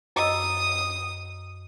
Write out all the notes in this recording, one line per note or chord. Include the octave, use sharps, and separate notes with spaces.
F#2 D#5 D#6 E6